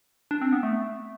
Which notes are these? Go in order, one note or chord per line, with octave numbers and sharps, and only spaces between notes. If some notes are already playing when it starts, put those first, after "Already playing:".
D4
C4
B3
A3